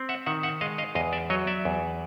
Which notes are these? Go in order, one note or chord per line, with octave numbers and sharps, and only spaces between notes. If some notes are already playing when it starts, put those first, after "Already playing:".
Already playing: C4
E5 F#5
D#3 E5 F#5
E5 F#5
G#3 D#5 F5
D#5 F5
E2 D#5 F5
D5 E5
F#3 C#5 D#5
D5 E5
E2